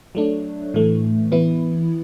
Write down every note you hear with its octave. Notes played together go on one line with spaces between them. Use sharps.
F#3 A3 D4
A2 E3 A3
E3 B3 E4